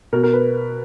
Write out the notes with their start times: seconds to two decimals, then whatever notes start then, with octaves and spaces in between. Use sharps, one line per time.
0.13 B2 A#4
0.23 A#4
0.33 B4